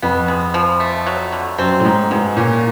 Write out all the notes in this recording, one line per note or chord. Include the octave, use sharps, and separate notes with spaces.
F2 B3
G#3
F3
A3
F#3
D3
F#2 C4
A2
G#2 G#3
G#2 B2
A#2 C#4